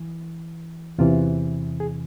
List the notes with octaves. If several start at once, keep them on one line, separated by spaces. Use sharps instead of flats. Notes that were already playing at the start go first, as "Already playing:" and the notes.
Already playing: E3
E2 C3 E3 F4
G#4